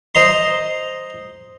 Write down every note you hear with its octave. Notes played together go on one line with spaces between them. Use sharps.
C5 D#5 A#5 C6